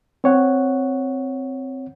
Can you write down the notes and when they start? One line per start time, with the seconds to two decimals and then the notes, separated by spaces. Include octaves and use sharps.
0.24 C4 C#5 F#5